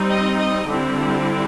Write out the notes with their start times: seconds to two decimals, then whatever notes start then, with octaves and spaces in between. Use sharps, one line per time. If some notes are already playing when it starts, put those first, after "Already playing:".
Already playing: G3 C4 D#4
0.09 D#5
0.38 D#5
0.68 D3 G3 C4 E4